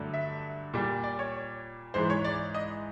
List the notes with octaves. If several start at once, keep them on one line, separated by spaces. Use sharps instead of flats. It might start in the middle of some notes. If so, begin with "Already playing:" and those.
Already playing: G2 D3 F#3 A3
E5
A#2 G3
D5
C#5
G#2 E3 G#3 C5
C#5
D5
D#5